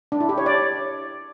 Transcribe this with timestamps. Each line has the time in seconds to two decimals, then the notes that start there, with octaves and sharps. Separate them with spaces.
0.12 D4
0.21 E4
0.29 G4
0.38 C#5
0.46 D5